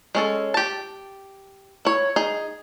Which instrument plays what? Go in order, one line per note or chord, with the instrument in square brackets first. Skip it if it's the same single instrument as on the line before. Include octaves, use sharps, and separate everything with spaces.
[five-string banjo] G#3 C#4 A4
G4 A5
E4 C#5
D#4 G#4